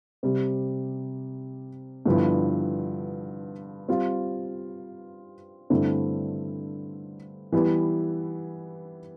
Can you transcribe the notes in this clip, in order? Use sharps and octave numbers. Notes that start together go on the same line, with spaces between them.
C3 G3 C4
G2 D3 F3 B3 E4
G3 C4 F4
G2 D3 A3 C4 E4
E3 G3 B3 E4